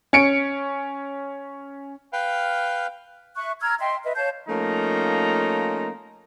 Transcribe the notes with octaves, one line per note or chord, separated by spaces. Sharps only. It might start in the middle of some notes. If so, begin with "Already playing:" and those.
C#4 C#7 D7
B4 F5 G5 F6
E5 C#6 F#6
A#5 E6 F6 G#6
D#5 E5 G5 C6
B4 D#5 E5
C#5 F5 A5 G6
F3 A3 A#3 C#4 D#4 A#5